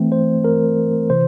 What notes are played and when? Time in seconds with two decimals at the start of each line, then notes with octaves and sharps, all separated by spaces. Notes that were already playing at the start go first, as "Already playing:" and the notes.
Already playing: E3 A3 C4
0.12 C5
0.44 A#4
1.10 C3 E3 C5